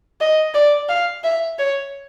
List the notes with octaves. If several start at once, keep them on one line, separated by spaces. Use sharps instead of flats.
D#5
D5
F5
E5
C#5